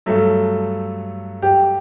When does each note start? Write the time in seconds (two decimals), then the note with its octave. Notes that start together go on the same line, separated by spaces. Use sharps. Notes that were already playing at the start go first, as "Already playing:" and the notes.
0.06 G2 F#3 A3 A4
1.42 G4